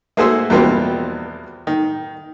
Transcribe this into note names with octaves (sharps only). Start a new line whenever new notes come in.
A3 A#3 F#4 G#4 C5 E5
E2 B2 F3 G3 A#3 C4
D#3